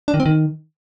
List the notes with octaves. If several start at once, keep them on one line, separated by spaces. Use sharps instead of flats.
D4
D#3
C4
D#3